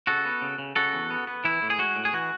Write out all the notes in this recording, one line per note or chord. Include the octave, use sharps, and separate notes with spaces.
C#3 F#4 A4
B3
C#3
C#3
C#3 F#4 A4
E2
B3
B3
E3 E4
A2
G#4
G#3 F#4
A2
G#4
E3 F#4